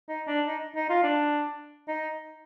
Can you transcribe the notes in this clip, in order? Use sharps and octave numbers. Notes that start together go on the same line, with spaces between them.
D#4
D4
D#4
D#4
F4
D4
D#4